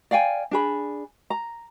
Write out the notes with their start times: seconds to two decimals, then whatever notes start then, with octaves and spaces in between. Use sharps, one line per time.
0.11 D5 F5 G5 G#5
0.51 D4 G#4 B5
1.30 A#5